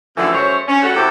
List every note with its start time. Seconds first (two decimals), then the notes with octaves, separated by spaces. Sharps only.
0.17 F#2 A2 D3 E3 F3 A3
0.32 F#2 G#3 A3 C5 C#5
0.68 C#4
0.82 G3 A3 C#4 F#4 A4 F#5
0.94 C3 F#3 E4 G4 A4